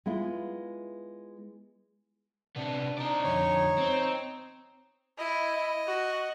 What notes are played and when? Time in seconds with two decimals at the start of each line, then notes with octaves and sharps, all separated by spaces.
0.06 G#3 B3 E4 F4
2.56 C3 B3 D4
2.98 C4 D#4 D5
3.24 F2 D3 C#5
3.78 C4
5.19 E4 D#5
5.87 F#4